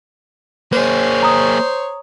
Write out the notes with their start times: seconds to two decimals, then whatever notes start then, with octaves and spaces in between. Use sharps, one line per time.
0.72 A#3 G#4 C5 C#5
1.23 A#5 D#6